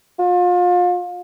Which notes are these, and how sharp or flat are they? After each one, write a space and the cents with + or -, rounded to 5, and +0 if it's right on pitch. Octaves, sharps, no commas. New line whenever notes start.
F4 +35